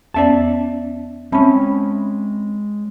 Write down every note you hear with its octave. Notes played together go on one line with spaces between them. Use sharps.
E2 B3 C#4 D5 E5 A5
G#3 C4 C#4 E5 A5 B5